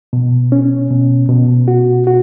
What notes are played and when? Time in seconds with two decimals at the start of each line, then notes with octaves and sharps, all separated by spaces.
0.13 B2
0.52 C#4
0.91 B2
1.29 B2
1.68 F#4
2.07 F#4